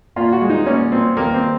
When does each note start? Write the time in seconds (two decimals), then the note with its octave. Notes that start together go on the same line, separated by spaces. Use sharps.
0.16 A#2 F4
0.32 F#4
0.41 G#3
0.50 D#4
0.66 A#2 C#4
0.92 A#2 C4
1.17 D#2 A#3
1.34 C4